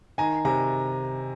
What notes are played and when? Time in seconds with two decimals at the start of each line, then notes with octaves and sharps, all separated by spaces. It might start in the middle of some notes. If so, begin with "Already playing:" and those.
0.18 D#3 G#5 A#5
0.45 C3 G#5 A#5